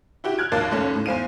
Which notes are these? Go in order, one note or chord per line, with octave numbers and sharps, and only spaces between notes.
E4 F#4 G4
F6 F#6 G#6 D7
A#1 D#2 A#3 F5 A5 A6
F#1 D#2 C#4 A4
A2
E2 C5 F5 D#7